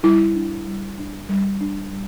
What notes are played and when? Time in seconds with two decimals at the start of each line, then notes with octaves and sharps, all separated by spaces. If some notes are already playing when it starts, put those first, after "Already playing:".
0.03 G3 E4
0.35 D4
0.67 G3
0.98 D4
1.29 G3
1.61 D4
1.92 G3